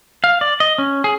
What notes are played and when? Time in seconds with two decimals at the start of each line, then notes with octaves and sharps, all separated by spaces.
0.24 F5
0.41 D5
0.60 D#5
0.78 C#4
1.04 G#4